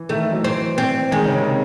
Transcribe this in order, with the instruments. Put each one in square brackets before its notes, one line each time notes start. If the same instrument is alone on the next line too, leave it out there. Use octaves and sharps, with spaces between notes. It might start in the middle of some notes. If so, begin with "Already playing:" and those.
Already playing: [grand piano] E3
[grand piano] D#3 [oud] A3
[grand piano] E3
F#3
[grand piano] E3 [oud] C4
[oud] C4
[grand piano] D#3 [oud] G#3
[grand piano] C#3
C3